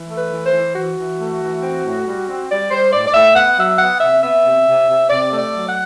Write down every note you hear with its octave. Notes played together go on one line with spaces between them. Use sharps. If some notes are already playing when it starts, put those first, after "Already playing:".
Already playing: E3
A3
B4
E3
C5
E3
E3 F#4
E3
A3
E3
C4
A2
G3
C4
G3 D5
G3 C5
A2 D5
D5
A2 E5
B3 F#5
F#3 E5
B3 F#5
C3 E5
B3 E5
C3
C3
C3
C3 D5
A3
D5
F#3
F#5